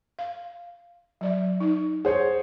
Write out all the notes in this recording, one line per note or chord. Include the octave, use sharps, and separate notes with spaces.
F5
F#3 D5 E5
D#4
G#4 C5 C#5 F#5